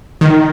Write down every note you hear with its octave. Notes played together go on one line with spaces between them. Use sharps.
D#3